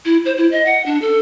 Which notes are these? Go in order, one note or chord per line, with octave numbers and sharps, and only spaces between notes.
E4
C5
E4
D#5
F#5
D4
A4